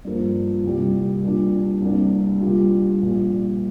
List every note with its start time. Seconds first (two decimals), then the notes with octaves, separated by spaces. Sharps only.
0.05 G2 F3 A#3
0.64 C2 A#2 G3
1.23 A#2 G3 D4
1.82 C2 C3 G3 A#3 D4
2.41 A#2 G3 D4 F4
3.00 A#1 A#2 G3